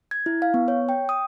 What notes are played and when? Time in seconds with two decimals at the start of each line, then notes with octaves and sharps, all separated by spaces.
0.11 G#6
0.26 E4
0.42 F5
0.54 B3
0.68 C#5
0.89 G5
1.09 D#6